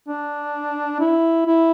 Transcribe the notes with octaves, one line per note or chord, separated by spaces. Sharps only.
D4
E4
E4